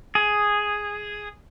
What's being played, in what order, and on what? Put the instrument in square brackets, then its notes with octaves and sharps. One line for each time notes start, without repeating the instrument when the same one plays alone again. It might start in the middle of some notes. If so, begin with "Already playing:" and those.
[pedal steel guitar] G#4